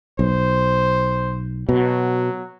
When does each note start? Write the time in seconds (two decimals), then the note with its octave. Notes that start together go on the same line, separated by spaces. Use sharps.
0.19 B1 C5
1.69 B2 F#3